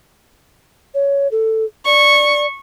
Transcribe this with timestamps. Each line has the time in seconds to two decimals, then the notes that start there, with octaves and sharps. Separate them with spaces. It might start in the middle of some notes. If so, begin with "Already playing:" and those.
0.94 C#5
1.31 A4
1.86 D5 C#6